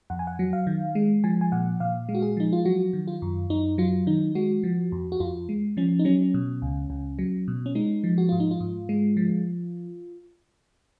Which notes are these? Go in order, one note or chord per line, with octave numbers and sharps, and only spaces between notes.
F2 F#5
G#5
F#5
F#3
F5
D#3
G#3
F3 G#5
G#5
A#2 F#5
A#2 F5
G#3
F#4
G#4
F3 D#4
F4
F#3 F#4
D#3
F4
F#2
F#2 D#4
F#3 F4
D#3 D#4
G#3 F#4
F3
F2
F#4
F2 F4
G#3
F3 C#4
D#4
F#3 C#4
B2
C#2
C#2
F#3
B2
C#4
G#3 D#4
F3
F#4
G#2 F4
D#4
F4
G#2
G#3
F3